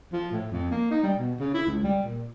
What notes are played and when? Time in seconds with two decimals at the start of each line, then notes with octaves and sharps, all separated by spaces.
0.12 F3
0.31 A2
0.51 F2
0.71 A#3
0.91 D#4
1.03 G3
1.18 B2
1.40 C#3
1.54 E4
1.67 C#2
1.83 G3
2.03 A#2